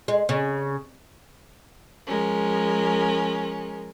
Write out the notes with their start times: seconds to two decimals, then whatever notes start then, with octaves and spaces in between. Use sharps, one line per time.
0.08 G#3
0.29 C#3
2.07 F3 G#3 C#4 A#4